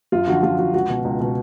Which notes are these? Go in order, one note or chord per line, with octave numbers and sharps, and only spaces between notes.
F#2 F4
D3 F3 F#4
F#2 F4
D3 F3 F#4
C#2 F#4
B2
C#2
B2